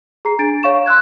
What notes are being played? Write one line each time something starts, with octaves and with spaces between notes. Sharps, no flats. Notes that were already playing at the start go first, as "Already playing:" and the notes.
G#4 A#5 C7
D4 A6 D7
C#5 F5 C#6 E7
C6 E6 F#6 G#6